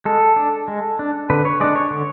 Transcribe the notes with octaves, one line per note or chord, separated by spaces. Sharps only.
G#3 A4
D4
G#3
D4
D3 B4
C#5
G#3 D4 D5
C#5
D3